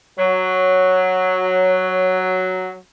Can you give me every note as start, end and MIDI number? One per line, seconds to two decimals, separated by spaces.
0.19 2.76 54
0.19 2.48 73